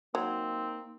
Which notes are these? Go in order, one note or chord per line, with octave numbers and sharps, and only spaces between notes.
F#3 A#3 C4 D#4